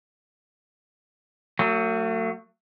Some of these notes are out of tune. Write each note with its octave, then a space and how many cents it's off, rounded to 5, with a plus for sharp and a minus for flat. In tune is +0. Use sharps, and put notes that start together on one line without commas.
F#3 +0 A3 +45